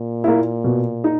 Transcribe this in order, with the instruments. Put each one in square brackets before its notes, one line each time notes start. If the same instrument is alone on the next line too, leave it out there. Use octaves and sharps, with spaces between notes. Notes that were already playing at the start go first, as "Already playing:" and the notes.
Already playing: [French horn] A#2
[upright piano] A#3 E4
B2
D#4